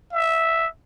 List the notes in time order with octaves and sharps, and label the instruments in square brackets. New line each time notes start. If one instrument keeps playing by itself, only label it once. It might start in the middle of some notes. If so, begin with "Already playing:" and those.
[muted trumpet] E5